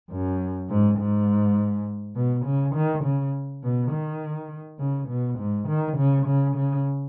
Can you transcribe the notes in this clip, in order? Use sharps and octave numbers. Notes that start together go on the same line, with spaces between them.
F#2
G#2
G#2
B2
C#3
D#3
C#3
B2
D#3
C#3
B2
G#2
D#3
C#3
C#3
C#3